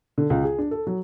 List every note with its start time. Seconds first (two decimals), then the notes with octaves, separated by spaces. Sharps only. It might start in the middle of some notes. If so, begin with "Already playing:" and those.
0.18 D3
0.30 C#2
0.44 G#4
0.58 D4
0.71 A4
0.87 F#3